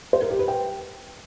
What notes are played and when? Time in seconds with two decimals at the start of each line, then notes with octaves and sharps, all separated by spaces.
0.13 C5
0.22 A#4
0.31 G4
0.39 B4
0.48 G5